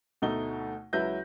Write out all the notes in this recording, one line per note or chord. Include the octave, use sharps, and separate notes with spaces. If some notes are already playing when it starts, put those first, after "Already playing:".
D2 B2 A3 D#4 G7
C#2 F#3 E4 B4 G6 A#6